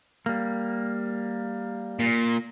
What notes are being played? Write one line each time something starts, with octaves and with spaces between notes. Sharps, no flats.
G3 A#3
A#2